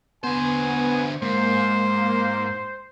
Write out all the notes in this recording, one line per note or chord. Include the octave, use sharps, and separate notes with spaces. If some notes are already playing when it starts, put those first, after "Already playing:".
D3 B3 C5 G#5
G#2 A#3 C5